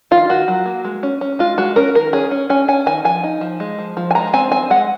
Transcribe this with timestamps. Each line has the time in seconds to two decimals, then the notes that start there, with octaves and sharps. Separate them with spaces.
0.11 D#3 F4
0.29 D#3 F#4
0.48 F#3
0.66 A#3
0.85 G#3
1.03 C#4
1.21 C#4
1.39 G#3 F4
1.58 G#3 F#4
1.76 C#4 A#4
1.95 D#3 A#4
2.13 C#4 G#4
2.31 C#4
2.50 C#4 G#5
2.68 C#4 G#5
2.86 D#3 G#5
3.05 F3 G#5
3.23 D#4
3.41 F3
3.60 G#3
3.79 F3
3.97 F3
4.11 G#5
4.15 G#3 A#5
4.33 C4 G#5
4.52 C4 G#5
4.70 G#3 F#5